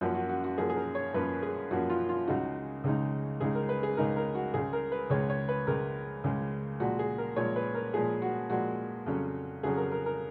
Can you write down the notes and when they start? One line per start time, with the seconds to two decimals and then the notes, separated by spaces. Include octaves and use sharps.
0.01 F#2 F3 A#3 C#4 F#4
0.15 F#4
0.29 F#4
0.44 F#4
0.57 F#2 F3 A#3 C#4 G#4
0.69 G#4
0.77 A#4
0.95 C#5
1.14 F#2 F3 A#3 C#4 B4
1.42 G#4
1.71 F#2 F3 A#3 C#4 F#4
1.89 F4
2.09 F4
2.27 C#2 C#3 G#3 D#4 F#4
2.84 C#2 C#3 G#3 D#4
3.40 C#2 C#3 G#3 D#4 G#4
3.55 A#4
3.69 B4
3.83 G#4
3.97 C#2 C#3 G#3 D#4 A#4
4.16 A#4
4.35 F#4
4.54 C#2 C#3 G#3 G#4
4.73 A#4
4.92 B4
5.10 C#2 C#3 G#3 C#5
5.30 C#5
5.48 B4
5.67 C#2 C#3 G#3 A#4
6.24 C#2 C#3 G#3
6.80 A#2 F3 G#3 F#4
6.99 G#4
7.18 A#4
7.36 A#2 F3 G#3 C#5
7.56 B4
7.75 A#4
7.93 A#2 F3 G#3 G#4
8.22 F#4
8.50 A#2 F3 G#3 F#4
9.06 F2 C#3 F#3 C#4
9.63 F2 C#3 F#3 C#4 G#4
9.77 A#4
9.91 A#4
10.06 A#4